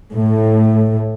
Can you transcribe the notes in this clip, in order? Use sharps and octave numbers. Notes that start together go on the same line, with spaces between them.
A2